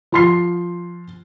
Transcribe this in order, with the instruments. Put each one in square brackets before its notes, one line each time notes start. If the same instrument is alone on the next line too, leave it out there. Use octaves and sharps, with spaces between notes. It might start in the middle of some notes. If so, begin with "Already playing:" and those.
[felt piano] F3 C6 C7